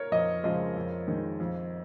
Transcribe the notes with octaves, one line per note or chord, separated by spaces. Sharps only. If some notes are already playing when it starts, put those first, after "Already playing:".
Already playing: A#4 C#5
F2 D#5
C#3 F3 G#3 D#5
F2
D#3 G#3
F2